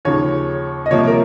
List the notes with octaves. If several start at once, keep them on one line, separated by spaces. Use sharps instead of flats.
D#2 C#3 F3 C#5
D#5
C2 C3 F3 A#3 C#5
A#4